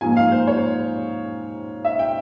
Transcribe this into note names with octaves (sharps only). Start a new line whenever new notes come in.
G#2 F3 A#3 G#5
F5
C5
C#5
E5
G5